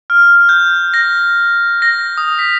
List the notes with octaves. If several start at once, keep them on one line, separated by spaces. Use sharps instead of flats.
F6
G6
A#6
A#6
D#6
B6